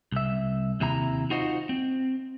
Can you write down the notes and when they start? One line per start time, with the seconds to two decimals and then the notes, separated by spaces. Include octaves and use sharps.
0.12 C2 E5
0.80 D#2 C3 E4 A#5
1.30 D#4 F4 F#4 C5 D#5
1.69 C4